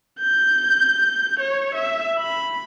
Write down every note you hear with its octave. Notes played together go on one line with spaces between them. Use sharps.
G6
C#5
E5
B5